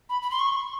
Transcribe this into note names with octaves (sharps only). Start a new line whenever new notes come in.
B5
B5
C6
C#6